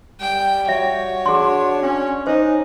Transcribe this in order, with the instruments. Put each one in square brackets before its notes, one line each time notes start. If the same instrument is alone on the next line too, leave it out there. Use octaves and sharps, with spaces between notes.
[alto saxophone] G3 [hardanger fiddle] G5
[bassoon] F#4 [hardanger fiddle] C#5 [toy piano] E5
[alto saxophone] D4 [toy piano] G#4 C6
[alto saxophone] C#4
[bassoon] C#4 [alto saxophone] D#4 [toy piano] C5